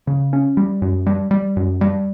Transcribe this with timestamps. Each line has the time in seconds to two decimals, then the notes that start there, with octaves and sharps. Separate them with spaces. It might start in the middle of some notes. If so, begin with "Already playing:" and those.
0.07 C#3
0.33 C#4
0.57 G3
0.82 F#2
1.06 G3
1.31 G3
1.57 F#2
1.81 G3